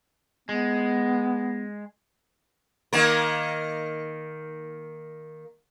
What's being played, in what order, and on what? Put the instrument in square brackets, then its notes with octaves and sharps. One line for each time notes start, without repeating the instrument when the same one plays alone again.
[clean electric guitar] G#3 [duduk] B3
[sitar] D#3 A#3 A#4